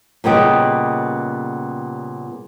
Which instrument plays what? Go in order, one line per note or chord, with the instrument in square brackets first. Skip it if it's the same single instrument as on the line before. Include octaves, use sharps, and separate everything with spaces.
[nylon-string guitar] A#2 C#3 G3 B3 G4 D#5